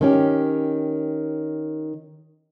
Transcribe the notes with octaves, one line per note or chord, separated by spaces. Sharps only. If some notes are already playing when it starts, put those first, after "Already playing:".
D#3 C#4 G4